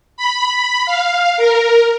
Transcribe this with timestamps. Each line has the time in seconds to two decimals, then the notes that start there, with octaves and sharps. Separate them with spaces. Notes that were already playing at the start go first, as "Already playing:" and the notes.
0.17 B5
0.86 F5
1.37 A#4